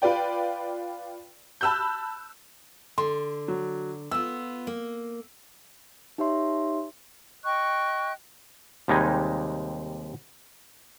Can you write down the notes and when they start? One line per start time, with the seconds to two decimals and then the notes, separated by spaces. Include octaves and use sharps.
0.02 F4 B4 D5 G5
1.61 A5 B5 E6 F#6 G6
2.98 D3 C6
3.48 F#3
4.11 B3 F4 E6
4.67 A#3
6.18 D#4 G4 C#5 E5 C6
7.45 D#5 G5 C#6 F#6
8.88 D#2 C3 G3 G#3 D#4 G#5